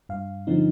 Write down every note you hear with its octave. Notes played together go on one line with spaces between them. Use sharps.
G2 F5
D3 F3 C4 D#4